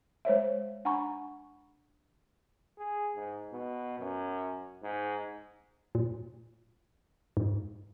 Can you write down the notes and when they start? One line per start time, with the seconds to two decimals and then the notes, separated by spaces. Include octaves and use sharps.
0.25 G#3 C5 C#5 E5
0.85 D4 F#5 G#5 A#5 B5 C#6
2.78 G#4
3.16 G#2
3.53 B2
3.99 F#2
4.83 G#2
5.95 A#2
7.37 G#2